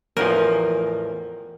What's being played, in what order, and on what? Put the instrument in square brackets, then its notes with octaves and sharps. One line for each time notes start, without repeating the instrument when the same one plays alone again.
[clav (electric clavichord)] A1 E2 F3 [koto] A#4